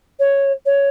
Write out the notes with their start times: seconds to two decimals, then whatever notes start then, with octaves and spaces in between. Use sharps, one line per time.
0.19 C#5
0.65 C#5